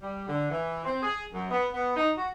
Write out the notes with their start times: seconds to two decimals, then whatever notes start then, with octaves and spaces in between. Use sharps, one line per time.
0.01 G3
0.28 D3
0.50 E3
0.84 C4
1.02 G#4
1.33 F#2
1.49 B3
1.73 B3
1.96 D#4
2.16 F#4